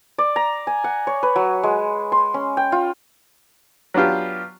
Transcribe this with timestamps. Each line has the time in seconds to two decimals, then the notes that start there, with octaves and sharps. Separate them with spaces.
0.18 D5
0.36 A#5
0.67 G#5
0.84 F#5
1.07 C#5
1.23 B4
1.36 F#3
1.63 G#3
2.12 C6
2.34 C#4
2.57 G5
2.72 F4
3.94 F#3 B3 D4 F4 G4